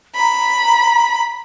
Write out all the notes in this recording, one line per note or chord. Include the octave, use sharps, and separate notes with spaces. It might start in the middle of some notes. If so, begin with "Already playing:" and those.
A#5 B5